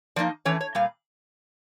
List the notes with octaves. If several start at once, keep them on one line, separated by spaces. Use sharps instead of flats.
F3 A#3 D#4 D5
E3 A3 C#4 C#5
C#5
A#2 G3 F5